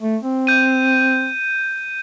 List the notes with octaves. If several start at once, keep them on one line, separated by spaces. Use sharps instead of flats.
A3
C4
G6 D#7